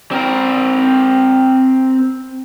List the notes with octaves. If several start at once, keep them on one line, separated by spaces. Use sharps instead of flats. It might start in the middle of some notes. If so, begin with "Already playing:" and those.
C4 A#4